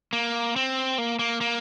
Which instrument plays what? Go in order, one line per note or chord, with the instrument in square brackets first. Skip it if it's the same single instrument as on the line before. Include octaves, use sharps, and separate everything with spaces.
[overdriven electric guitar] A#3
C4
A#3
A#3
A#3